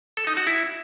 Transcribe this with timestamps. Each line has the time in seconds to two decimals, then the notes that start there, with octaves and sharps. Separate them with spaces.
0.17 A4
0.27 D#4
0.37 F#4
0.47 E4